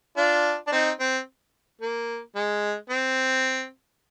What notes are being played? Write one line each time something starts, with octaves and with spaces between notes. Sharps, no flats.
D4 F4
D4
C4 D#4
C4
A#3
G#3
C4